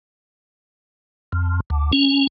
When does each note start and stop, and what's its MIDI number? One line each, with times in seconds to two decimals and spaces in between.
1.32 1.60 41
1.70 1.91 38
1.93 2.27 61